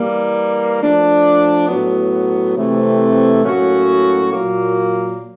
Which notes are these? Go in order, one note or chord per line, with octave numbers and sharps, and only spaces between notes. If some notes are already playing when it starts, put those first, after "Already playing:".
Already playing: E3 G3 A#3
F3 A3 D4
A2 F#3 B3
C3 E3 A3 C4
A2 F#3 A#3 C#4 F#4
A#2 F#3 A#3